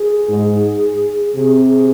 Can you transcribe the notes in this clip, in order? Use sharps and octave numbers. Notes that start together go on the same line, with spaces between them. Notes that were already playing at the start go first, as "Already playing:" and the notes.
Already playing: G#4
G#2
C3 G#4